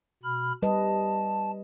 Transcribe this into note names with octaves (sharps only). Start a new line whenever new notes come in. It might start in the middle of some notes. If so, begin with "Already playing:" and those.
B2 B5 F6
G3 B4 D#5 A5